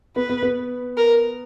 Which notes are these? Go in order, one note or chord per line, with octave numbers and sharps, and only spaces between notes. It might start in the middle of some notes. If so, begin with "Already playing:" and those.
B3 B4
B3
B3
A#4